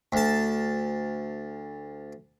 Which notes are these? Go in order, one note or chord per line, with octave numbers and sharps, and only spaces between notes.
D2 A5